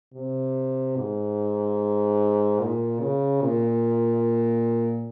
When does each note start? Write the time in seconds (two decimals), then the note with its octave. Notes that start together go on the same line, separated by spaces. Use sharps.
0.14 C3
0.97 G#2
2.60 A#2
3.00 C#3
3.41 A#2